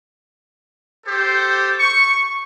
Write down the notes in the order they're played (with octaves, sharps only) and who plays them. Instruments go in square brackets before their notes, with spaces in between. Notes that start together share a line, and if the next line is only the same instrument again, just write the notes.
[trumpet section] G4 A4 C5
C#6